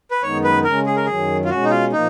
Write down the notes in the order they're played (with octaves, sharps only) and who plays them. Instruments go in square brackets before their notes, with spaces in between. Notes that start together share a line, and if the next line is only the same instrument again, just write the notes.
[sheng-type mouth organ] B4
[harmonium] F#2 D#3 G#3 B3 D#4 [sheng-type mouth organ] C#5
[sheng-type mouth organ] B4
[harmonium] C#3 G#3 C#4 [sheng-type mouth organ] A#4
[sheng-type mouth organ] G#4
A#4
[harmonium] F#2 D#3 F#3 [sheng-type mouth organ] G#4
[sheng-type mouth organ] F4
[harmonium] B2 G#3 C#4 [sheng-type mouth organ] F#4
[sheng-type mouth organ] D#4
F4
[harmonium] A#2 F3 A#3 [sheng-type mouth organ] D#4